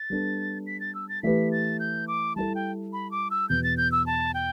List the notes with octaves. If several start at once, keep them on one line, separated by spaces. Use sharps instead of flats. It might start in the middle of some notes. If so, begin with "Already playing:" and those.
Already playing: A6
G3 B3 D4 A4
B6
A6
E6
A6
E3 A3 G4 B4 B6
A6
G6
D6
G3 E4 A4 A5
G5
B5
D6
E6
E2 B2 B3 G6
A6
G6
E6
A5
G5